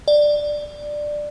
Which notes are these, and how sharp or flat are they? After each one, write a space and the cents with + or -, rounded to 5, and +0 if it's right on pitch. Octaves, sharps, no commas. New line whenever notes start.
D5 +10